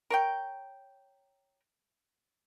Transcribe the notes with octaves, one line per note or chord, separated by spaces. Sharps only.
A#4 C#5 G5